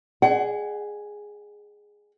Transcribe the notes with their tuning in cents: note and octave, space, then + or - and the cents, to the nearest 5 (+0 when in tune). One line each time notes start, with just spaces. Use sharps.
G#4 +0 D#5 -40 F#5 +35